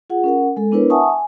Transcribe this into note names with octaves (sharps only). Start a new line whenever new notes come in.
F4 G#4 F#5
C#4 A#4 F#5
G#3 A4
B3 D4 E4 A#4 B4 C#5
E5 F#5 G#5 A5 C#6 D#6
G#5